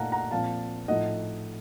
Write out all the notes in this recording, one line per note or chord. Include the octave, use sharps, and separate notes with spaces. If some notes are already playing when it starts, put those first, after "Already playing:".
Already playing: A#2 A3 D#4 F5 F#5 A5 A#5
F#5 A#5
A#2 F3 C4 F5 A5
A2 F3 A3 D#4 D#5 F#5